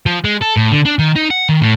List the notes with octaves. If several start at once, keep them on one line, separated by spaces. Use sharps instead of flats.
F3
G#3
A4
A2
D3
D4
D#3
D#4
F#5
D#3
A2